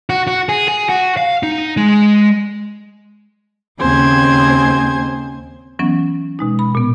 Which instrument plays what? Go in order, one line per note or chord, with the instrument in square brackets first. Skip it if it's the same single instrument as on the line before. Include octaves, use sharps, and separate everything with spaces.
[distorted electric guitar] F#4
F#4
G#4
G#4
F#4
F5
D#4
G#3
[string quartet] D#2 C#3 C4 C5 G#5 G#6
[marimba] E3 F#3 B3 C#4
B2 G#3 D#4
B5
A#2 B3